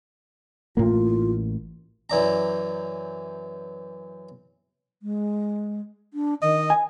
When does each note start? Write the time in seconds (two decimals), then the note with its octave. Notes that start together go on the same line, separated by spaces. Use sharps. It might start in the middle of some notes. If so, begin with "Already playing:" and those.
0.77 A1 A2 A#3 F4
2.10 F#2 E3 D5 A#5
5.02 G#3
6.14 D4
6.42 D#3 D#5
6.70 G#5